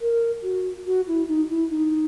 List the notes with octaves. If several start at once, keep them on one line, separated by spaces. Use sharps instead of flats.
A#4
F#4
F#4
E4
D#4
E4
D#4